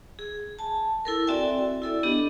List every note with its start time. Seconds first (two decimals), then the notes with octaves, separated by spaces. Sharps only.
0.19 G#4
0.59 G#5 A5
1.05 E4 A4 A#4
1.27 C4 F#4 D5 E5 G5 G#5
1.82 E4 A4 D5
2.03 B3 D4 G4 D#5